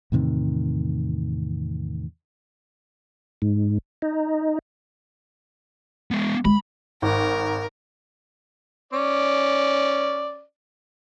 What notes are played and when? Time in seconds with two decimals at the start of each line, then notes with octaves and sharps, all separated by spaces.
0.12 E2 A2 C3 D#3
3.42 G#2
4.02 D#4
6.11 G#3 B3
6.45 G#3 B5
7.02 G#1 A#4
8.93 C#4 D5